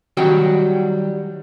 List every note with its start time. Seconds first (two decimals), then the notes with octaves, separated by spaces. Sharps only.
0.17 D#3 F#3 G3 F#4 G5